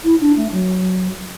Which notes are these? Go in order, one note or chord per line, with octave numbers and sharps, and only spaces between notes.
E4
D4
A3
F#3